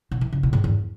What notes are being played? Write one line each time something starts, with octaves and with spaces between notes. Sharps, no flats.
B2
E3
C#3
B2
G#2
E2